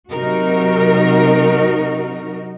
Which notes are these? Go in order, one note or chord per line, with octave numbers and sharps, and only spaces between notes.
C3 F#3 D#4 F#4 A#4